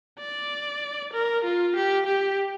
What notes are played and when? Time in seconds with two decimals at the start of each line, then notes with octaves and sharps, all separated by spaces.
0.19 D5
1.13 A#4
1.44 F4
1.76 G4
2.06 G4